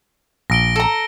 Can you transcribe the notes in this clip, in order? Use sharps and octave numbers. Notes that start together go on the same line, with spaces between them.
A#1 A#6 D7 G7
A4 A#5